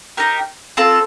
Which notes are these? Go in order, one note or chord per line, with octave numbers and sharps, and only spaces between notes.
D#4 G4 A#4
C4 F4 A4